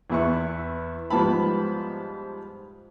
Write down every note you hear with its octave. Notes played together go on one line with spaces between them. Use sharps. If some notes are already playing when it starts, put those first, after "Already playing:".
E2 B3 E4 B4 C#6
G#2 F3 G3 B3 A5 B5